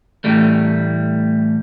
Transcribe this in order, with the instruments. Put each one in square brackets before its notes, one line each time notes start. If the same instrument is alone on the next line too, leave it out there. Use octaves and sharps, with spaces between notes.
[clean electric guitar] A2 E3 G3 A3